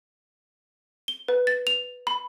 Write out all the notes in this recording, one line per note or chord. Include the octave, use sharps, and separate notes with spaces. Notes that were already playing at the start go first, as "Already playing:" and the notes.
G7
B4
A6
F7
B5